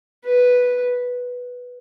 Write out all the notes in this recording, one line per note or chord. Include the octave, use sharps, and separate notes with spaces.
B4